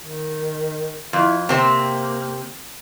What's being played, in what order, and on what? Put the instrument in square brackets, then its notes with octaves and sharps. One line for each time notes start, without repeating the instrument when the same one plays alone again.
[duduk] D#3
[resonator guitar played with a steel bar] F2 [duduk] E4
[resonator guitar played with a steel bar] C3 C4 [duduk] A#3